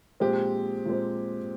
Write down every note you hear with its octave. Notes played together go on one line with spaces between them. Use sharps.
A#2 F3 G#3 C4 G4
A#2 F3 G#3 C4